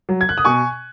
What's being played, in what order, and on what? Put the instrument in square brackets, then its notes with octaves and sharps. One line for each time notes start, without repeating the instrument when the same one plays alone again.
[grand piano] F#3
G#6
F#6
D#6
B2 G#5 C#6